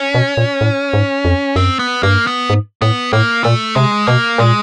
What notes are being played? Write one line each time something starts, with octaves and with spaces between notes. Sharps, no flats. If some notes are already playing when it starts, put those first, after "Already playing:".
Already playing: C#4
B2
A#2
A2
G#2
F2
F#2 C4
B3
G2 A#3
B3
G#2
A2 B3
A2 A#3
A#2 A3
C3 G#3
B2 A#3
A#2 G#3